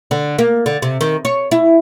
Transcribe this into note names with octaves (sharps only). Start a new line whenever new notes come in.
D3
A#3
D3
C3
D#3
C#5
E4